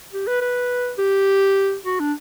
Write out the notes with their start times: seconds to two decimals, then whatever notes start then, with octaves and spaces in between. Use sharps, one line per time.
0.13 G4
0.27 B4
0.41 B4
0.98 G4
1.86 F#4
2.00 D4